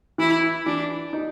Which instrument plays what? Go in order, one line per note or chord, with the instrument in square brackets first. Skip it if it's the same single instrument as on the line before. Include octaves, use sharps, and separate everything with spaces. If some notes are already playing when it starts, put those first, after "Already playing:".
[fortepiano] E3 [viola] E4
[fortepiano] E3 [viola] D4
[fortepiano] D#4